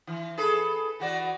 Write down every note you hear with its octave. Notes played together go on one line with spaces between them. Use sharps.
E3
G#4 A4 B4
E3 F#4 D5